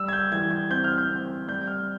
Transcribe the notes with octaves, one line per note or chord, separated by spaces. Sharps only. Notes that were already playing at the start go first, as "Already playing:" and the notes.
Already playing: G3 E6
G#6
G6
E3 G#6
G#6
C4 G6
F6
G6
C4
G3 G6
F6